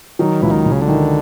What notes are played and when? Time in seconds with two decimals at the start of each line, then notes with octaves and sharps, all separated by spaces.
0.19 D#3 F#3
0.42 C#2 E3
0.50 D#3
0.66 C#2
0.72 C#3
0.82 D3
0.88 D#3